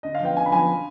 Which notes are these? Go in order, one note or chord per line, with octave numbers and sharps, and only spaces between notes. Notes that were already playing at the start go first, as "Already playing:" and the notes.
D3 D#5
F5
F3 B3 G5
D3 G#5
B5
F3 B3 G#5